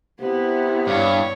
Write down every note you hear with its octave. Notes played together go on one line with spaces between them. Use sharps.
C3 B3 E4
G2 C#5